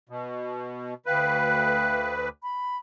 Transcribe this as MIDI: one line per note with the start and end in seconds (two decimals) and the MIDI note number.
0.09 0.94 47
1.06 2.29 38
1.06 2.29 71
1.06 2.13 77
1.06 2.13 79
1.06 2.13 90
2.41 2.74 83